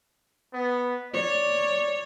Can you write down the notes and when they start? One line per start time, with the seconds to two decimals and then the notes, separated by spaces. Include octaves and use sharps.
0.54 B3
1.14 C#5 D5